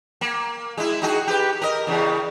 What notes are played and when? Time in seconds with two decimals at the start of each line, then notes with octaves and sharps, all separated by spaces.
0.21 A#3
0.77 G#3 E4
1.02 D#4 F#4 G#4
1.27 G4 B4
1.62 A#4 D#5
1.87 E2 C#3